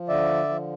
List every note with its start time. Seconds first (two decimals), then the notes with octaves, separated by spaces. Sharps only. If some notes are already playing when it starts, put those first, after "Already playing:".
Already playing: F3
0.08 D3 D5 E5
0.49 F3